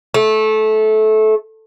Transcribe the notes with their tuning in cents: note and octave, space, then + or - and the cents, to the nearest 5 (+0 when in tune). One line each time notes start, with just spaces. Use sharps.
A3 -20